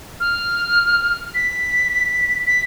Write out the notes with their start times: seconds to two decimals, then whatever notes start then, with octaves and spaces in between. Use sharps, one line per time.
0.20 F6
1.34 B6
2.46 B6